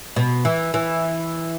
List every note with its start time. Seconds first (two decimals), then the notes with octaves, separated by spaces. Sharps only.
0.16 B2
0.45 E3
0.74 E3